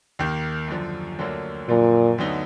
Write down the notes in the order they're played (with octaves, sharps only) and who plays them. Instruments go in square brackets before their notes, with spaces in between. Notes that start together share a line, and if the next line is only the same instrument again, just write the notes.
[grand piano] D#2 D#3 A#3
F#2 D3 F3
D2 D3 F#3 A#3
[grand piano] F#2 D3 F3 [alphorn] A#2
[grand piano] D2 D3 F#3 B3 D#4